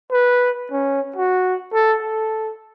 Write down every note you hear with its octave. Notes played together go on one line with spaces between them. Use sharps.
B4
C#4
F#4
A4
A4